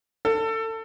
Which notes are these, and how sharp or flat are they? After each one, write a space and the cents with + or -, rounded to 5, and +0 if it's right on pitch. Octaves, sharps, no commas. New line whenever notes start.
A4 +25